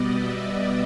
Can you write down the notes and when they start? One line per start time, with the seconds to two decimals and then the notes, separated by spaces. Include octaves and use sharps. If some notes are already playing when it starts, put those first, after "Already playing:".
Already playing: B2 G3 B3 D5 D#5
0.12 E5
0.54 D#5